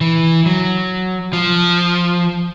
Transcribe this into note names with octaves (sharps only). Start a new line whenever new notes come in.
E3
F#3
F3